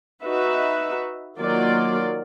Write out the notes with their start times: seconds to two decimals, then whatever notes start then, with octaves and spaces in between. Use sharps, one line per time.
0.22 D#4 F#4 B4 E5
1.37 D#3 F#3 A#3 F4 D5